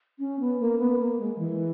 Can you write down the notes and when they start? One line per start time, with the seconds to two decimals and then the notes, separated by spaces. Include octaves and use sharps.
0.19 C#4
0.40 B3
0.60 A#3
0.79 B3
0.99 A#3
1.19 G#3
1.38 E3